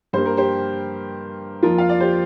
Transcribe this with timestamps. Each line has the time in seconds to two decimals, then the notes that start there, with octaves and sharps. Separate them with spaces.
0.13 G2 G3 A#3 C5
0.26 A#4
0.37 G4 C5
1.63 F2 F3 A#3 F4 A#4
1.78 F5
1.89 D5
2.00 G4 C5